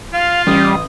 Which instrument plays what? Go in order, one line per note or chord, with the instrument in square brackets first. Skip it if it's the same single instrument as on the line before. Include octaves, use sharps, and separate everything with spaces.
[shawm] F4 [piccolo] F5
[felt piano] A1 [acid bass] G3 [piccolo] D#6